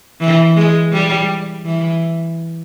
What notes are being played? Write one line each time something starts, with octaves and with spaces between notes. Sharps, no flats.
E3
G#3
G3
E3